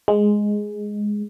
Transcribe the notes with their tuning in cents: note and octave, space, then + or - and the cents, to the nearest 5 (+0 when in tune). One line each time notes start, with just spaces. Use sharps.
G#3 +0